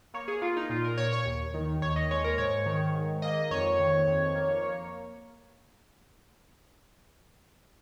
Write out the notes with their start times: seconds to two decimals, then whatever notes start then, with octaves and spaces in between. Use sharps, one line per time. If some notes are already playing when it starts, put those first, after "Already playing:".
0.14 A#3 C#5
0.28 G#4
0.42 A#3 F4
0.57 D#4
0.69 A#2 F4
0.84 A#4
0.98 A#2 C#5
1.13 C#5
1.26 D#2
1.54 D#3
1.82 D#2 C#5
1.96 D#5
2.11 G#3 C#5
2.24 A#4
2.38 G#2 C#5
2.66 D#3
2.94 G#2
3.22 A#3 D#5
3.51 F2 C#5
3.79 D#3
4.07 F2
4.35 A#3
4.63 A#3